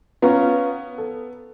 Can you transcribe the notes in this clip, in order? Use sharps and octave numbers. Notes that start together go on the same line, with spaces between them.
B3 C#4 F4 A#5
A4